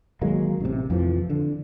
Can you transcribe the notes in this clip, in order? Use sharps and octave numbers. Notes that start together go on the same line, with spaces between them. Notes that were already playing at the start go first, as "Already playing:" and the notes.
D#3 F#3 G#3 A#3
A1 C3
F2 E3 F3
D3